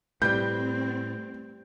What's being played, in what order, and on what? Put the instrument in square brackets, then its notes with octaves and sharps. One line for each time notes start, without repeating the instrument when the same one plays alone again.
[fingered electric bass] A2 [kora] G3 G4 B4 [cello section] C4 [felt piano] G6